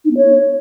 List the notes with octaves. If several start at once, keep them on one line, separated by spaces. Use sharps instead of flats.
D#4
B3
C#5